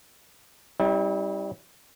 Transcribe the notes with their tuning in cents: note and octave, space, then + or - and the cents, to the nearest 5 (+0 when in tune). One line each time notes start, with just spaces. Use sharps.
G3 +0 C4 +40 E4 -40